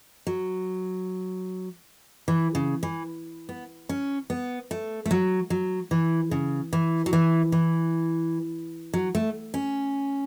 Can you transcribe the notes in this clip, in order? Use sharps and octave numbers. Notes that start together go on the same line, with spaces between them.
F#3
E3
C#3
E3
B3
C#4
B3
A3
A3
F#3
F#3
E3
C#3
E3
F#3
E3
E3
F#3
A3
C#4